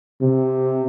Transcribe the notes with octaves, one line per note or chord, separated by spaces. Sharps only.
C3